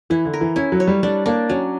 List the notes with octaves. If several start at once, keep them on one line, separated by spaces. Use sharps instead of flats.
E3 E4
D3
A#4
E3
C#4 E4
F#3
C#5
G3
G3 D4
A#3 D4
F#3 C#4